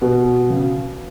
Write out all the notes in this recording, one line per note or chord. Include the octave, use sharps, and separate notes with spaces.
B2
C#3